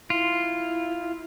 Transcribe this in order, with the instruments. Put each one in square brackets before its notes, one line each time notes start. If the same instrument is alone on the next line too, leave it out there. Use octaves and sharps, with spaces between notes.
[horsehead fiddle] E4 [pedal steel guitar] F4